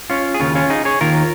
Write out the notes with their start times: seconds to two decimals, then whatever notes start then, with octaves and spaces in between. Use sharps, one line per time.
0.10 C#4 F4
0.34 G#4
0.40 D#2 C#3 C#4 F4
0.55 C#4 F4
0.70 D#4 G#4
0.85 G#4 C#5
1.01 D#2 D#3 F4 A#4